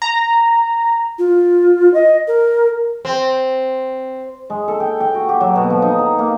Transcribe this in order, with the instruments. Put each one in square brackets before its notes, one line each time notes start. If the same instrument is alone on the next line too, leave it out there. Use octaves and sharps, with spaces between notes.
[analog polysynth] A#5
[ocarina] F4
D#5
A#4
[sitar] C4
[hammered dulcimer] G#3
A4
G5
G5
F#4
G4
F#3
B2
F3
D#4
A#5
A#3